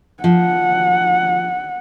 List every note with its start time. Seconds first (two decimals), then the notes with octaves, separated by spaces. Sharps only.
0.24 F3 F#5